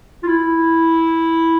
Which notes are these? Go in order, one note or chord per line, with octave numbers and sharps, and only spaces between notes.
F4
E4